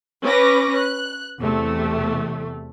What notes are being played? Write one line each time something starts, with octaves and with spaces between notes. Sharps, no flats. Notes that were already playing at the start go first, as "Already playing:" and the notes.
C#4 B4 D6 A#6
F#6
E2 C3 A3